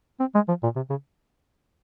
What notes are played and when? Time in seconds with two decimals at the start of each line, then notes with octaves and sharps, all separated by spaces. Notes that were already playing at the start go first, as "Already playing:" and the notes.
0.20 C4
0.35 G#3
0.48 F3
0.63 A#2
0.76 C3
0.90 C#3